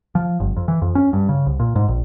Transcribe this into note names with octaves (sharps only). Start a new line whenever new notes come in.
F3
G1
F2
E3
F2
C#4
G2
C#3
C2
A#2
G#2
A#1